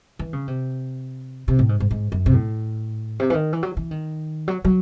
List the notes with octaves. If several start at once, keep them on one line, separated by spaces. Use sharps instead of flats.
E3
C#3
C3
C3
A2
G#2
G#2
G#2
F#2
C3
A2
C3
E3
D#3
E3
F#3
E3
D#3
F#3
F#3